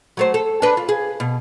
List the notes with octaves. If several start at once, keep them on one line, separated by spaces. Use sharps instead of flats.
F#3 A3 C5
A4
D4 B4
F4
G#4
B2